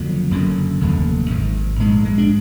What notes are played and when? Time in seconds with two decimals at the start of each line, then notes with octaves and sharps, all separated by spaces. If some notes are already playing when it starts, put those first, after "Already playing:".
Already playing: F#1 F2 D3 F#3
0.31 F#1 F#2 D3
0.81 F1 D#2 D3
1.30 G#1 G#2
1.79 A#1 G#2 G#3
2.05 G#3
2.18 D4